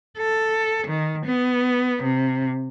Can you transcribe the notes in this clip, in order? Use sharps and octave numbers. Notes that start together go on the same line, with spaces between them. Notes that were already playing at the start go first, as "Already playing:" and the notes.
A4
D#3
B3
C3